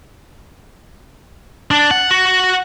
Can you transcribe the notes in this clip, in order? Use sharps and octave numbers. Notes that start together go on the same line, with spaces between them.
D4
F#5
F#4